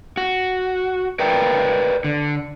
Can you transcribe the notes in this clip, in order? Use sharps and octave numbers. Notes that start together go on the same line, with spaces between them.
F#4
A#4 B4 D5 G5 A#5
D3